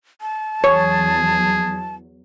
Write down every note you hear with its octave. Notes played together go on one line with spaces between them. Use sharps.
A5
E2 F#3 G#4 C#5